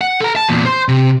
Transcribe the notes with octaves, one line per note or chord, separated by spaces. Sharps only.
F#5
A4 A#5
A5
E2 A#2
C5 C6
C3